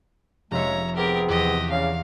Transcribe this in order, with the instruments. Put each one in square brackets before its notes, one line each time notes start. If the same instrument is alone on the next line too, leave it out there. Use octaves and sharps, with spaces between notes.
[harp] F1 E5 [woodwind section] C#3 G#3 [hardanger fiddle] C#5 A#5
[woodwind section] B3 C4 G#4 [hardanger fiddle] G4 A#4
[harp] E2 [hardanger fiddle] G4 D#5
[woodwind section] C#3 C#4 [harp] D5 A#5 [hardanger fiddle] F5